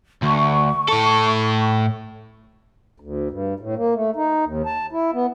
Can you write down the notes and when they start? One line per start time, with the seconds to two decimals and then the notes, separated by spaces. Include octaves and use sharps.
0.23 D2 C#6
0.89 A2 A4
3.00 D2
3.31 G2
3.60 A2
3.76 A#3
3.94 A3
4.16 D#4
4.45 D#2
4.66 A5
4.92 E4
5.14 B3